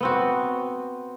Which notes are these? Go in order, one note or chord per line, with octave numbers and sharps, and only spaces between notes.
B3 C4 F#4